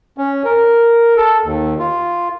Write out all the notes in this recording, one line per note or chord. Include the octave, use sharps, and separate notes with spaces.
C#4
A#4
A4
D#2
F4